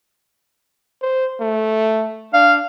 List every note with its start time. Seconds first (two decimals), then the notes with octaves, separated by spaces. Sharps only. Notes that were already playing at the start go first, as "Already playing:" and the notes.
1.02 C5
1.40 A3
2.33 D4 F5